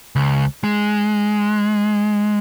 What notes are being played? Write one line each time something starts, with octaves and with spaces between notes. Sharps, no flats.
C#2
G#3